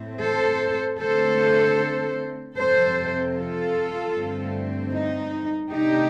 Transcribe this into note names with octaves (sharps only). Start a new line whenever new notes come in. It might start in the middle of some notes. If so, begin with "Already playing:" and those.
Already playing: A2 A3 C4
A4 C5
D3 A3 C4 A4 C5
F2 C3 F3 C4 A4 C5
F4 A4
G2 D3 A3 C4
D#4
C3 D#3 A3 D4 D#4 G4